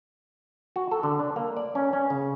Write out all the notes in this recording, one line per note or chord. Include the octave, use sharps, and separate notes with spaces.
F#4
A4
D3
D4
A#3
D5
C#4
C#4
C#3